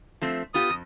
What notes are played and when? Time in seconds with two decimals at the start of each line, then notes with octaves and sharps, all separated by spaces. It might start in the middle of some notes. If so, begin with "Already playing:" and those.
0.21 F3 A3 C4
0.54 B3 F4 G4 D#6
0.70 F2